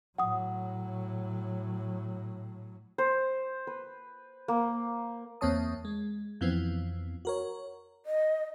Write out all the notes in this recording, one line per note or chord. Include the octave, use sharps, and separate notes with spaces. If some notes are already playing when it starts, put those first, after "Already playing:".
A2 F#3 F#5 D#6
C5
B4
A#3
E2 A#3 C4 C#5 A5 D#6
G#3
F2 E3 F3 B3 C4
F#4 A#4 C#5
D#5